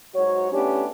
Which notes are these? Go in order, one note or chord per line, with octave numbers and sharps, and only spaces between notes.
G#2 F#3 F#4 C#5
A2 B3 C#4 D4 G4